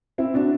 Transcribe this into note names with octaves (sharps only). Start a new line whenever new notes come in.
C4 E4
D4 F#4